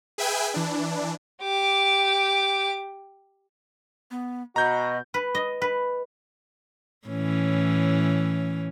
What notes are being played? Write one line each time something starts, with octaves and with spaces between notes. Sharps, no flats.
G#4 B4 E5 G5 G#5
E3 D4
G4 D6
B3
B2 F#4 D#5 A#5 G6
B4
D#5
B4
A2 E3 C#4